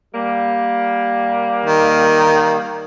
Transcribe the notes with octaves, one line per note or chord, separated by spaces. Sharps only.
G3 A#3
D#3